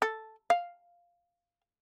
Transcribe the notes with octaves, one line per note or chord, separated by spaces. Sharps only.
A4
F5